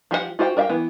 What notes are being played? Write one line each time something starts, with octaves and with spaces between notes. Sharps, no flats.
F3 G4 G#4 F#5
F4 F#4 C5 F5 G5
A#4 D5 E5 F5 G5
E3 B3